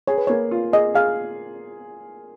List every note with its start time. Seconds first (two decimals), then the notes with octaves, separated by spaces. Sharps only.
0.08 G#4 C#5
0.18 B4
0.27 A#3 C#5
0.51 F4
0.73 G#4 D#5
0.94 G#4 F5